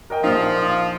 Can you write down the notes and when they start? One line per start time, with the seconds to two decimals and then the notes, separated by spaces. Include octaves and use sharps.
0.10 A#4 D#5 G5
0.24 A#1 F3 A#3 D#4